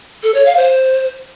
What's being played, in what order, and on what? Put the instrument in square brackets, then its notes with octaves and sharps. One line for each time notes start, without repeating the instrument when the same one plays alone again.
[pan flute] A4
C#5
F5
C5